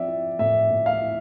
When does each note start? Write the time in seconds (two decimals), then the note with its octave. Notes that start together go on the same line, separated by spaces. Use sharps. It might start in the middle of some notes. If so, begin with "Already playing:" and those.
Already playing: F3 C4 D5 E5
0.08 E4
0.39 A2 E5
0.71 A2
0.86 F5
1.01 E4